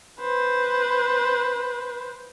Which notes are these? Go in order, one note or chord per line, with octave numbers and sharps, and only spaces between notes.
B4 C5